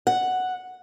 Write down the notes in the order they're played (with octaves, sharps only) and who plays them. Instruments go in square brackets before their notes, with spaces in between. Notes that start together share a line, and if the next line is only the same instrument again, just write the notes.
[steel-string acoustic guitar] F#5